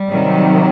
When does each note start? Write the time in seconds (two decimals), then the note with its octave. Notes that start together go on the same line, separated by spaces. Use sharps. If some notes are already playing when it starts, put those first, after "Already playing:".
Already playing: G3
0.09 C3 D#3 F#3